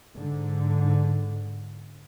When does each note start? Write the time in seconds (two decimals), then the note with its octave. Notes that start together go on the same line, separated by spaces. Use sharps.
0.16 G#2 D3